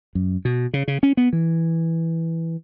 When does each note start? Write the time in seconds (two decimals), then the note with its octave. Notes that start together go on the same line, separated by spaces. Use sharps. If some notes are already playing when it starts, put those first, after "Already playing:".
0.15 F#2
0.45 B2
0.74 C#3
0.88 C#3
1.03 C#4
1.17 B3
1.33 E3